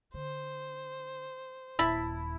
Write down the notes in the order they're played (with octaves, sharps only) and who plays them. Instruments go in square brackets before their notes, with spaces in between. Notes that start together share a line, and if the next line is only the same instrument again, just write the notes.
[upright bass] D3 [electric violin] C5
[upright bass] D#1 [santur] E4 [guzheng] E5 A5 B5